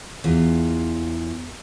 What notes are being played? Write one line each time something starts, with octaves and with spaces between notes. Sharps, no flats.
E2 F4